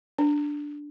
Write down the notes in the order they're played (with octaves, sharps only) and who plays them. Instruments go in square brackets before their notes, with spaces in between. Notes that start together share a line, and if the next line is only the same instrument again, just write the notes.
[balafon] D4